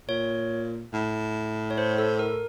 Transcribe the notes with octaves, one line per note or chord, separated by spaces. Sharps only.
A#2 C#5
A2
C#5
C5
A4
A#4